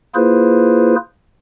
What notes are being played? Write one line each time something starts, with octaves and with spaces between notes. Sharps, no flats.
A#3 E4 F4 G#4 B4 C5